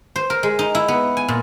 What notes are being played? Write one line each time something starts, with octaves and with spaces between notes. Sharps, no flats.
C5
A#4
G#3
D#4
E4
B3
G#5
A#2